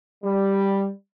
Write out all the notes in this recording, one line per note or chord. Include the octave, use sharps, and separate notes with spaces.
G3